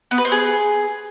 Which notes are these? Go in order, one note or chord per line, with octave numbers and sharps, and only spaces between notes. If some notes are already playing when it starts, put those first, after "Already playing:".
B3
B4
C4
G#4